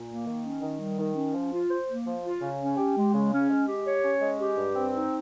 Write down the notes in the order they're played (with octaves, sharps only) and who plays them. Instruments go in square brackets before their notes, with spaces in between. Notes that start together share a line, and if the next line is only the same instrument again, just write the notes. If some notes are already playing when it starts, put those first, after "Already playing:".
Already playing: [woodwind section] A#2
A#3
D#3
C#4
D#3
G3
D#3
C#4
F3
F4
C5
A#3
F3
F4
C#3
C#4
G4
G#3
C#3
C#4
G#3
G4
C#5
C#4
G#3
G4
G2
C4
D#4